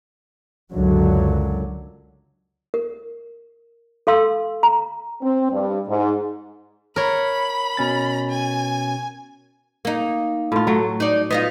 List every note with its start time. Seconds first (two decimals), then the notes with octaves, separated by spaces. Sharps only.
0.72 C#2 F#2 D3 F#3
2.74 A#4
4.07 A4 F5 C6 E6
4.63 A#5
5.22 C4
5.52 G2
5.88 G#2
6.96 A#4 C#5 B5
7.77 B2 C#4 A6
8.30 G#5
9.85 A#3 D#4
10.52 A2 F4
10.67 F#3 A3
11.00 D#4 D5
11.31 B3 D#4 F4 D#5